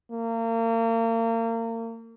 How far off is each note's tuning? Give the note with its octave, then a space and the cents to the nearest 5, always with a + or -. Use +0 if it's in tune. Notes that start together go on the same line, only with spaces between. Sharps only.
A#3 -35